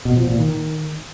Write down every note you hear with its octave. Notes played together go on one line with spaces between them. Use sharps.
B2
F3
A#2
D#3